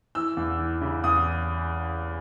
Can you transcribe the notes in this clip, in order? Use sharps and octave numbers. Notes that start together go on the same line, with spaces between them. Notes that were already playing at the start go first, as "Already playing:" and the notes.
E3 E6
E2
E3
C#3
E2 D#6